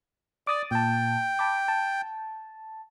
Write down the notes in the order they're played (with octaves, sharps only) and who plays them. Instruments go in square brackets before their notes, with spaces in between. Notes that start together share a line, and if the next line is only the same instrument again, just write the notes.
[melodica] D5 [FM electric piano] D6 D#6 A6
[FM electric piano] A#2 A5 [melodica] G5
[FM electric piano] A5 B5 D6
A5